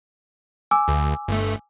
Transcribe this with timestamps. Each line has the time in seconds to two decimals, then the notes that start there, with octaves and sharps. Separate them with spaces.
0.71 G#5 D6 E6
0.88 D2
1.28 G1 A3